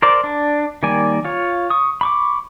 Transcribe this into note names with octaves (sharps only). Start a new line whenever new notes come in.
A#4 C5 D5
D4
D#3 G3 A#3 D5 G#5
F4 C#5
C#6 D#6
B5 C#6 D6